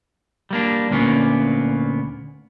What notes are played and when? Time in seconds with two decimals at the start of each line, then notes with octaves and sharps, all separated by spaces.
0.51 G3 A#3 D4
0.90 D2 A#2 A#3 B3 C#4